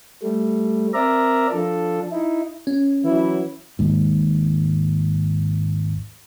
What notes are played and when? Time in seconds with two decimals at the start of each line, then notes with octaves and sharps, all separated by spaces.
0.23 G3 A3
0.94 C4 A#4 D5 E5 A#5
1.52 F3 D4 A4
2.12 D#4 E4
2.67 C#4
3.03 E3 F#3 E4
3.79 G#1 D#2 G#2